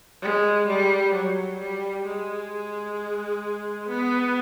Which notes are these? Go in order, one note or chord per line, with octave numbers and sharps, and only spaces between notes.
G#3
G3
F#3
G3
G#3
B3